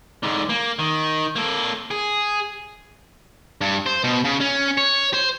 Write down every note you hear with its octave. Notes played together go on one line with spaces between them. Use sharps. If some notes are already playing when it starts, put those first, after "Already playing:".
G#2 D3
A#3
D#3
A#3 A4
G#4
G2
C5
B2
C#3
C#4
C#5
C5